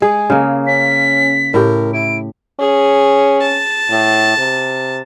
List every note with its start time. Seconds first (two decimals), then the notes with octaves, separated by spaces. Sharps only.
0.02 G#3 G#4
0.30 C#3 A#3
0.67 C#4 B6
1.54 A2 G4 A#4
1.94 E4 D7
2.60 C#4 G#4
3.42 A5
3.90 A2
4.38 C3